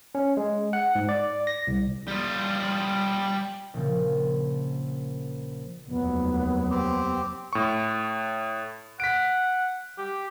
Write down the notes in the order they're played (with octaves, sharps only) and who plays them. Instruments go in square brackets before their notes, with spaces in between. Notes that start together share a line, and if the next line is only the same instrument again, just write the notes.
[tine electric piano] C#4
G#3
F#5
G#2
D5
A#6
C2
[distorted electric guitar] G3 F4
[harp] A#1 C#3
[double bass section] F1 D#2 F#3 [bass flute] B3
[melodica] C4 G4
[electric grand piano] A2 C#6
[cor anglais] F#5 [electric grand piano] B6 D7
[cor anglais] G4